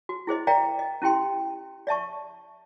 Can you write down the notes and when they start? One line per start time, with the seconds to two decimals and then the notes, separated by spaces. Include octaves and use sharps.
0.09 F#4
0.27 E4 G#4 C5 D#5
0.47 A#4 D5 E5 F5 G5 A#5
0.79 D#5
1.02 C#4 E4 G4 G5 C6
1.87 D5 E5 A5 C#6